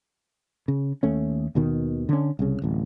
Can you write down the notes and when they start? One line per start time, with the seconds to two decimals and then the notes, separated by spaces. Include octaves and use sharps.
0.68 C#3
1.03 D#2 A3 C#4
1.55 D#2 B2 D#3
2.09 D3 C#4
2.39 C2 C#3
2.62 D1 A1